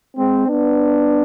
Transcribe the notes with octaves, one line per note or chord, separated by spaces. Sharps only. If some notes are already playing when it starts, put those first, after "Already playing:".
G#3 C4
B3 D4